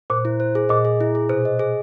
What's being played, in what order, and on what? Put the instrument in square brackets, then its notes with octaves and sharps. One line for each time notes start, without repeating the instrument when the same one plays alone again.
[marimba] A#2 [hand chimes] C5
[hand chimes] E4
C5
G#4
[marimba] A#2 [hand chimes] D#5
[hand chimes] G#4
E4
G#4
[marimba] B2 [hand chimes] C5
[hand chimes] D#5
G#4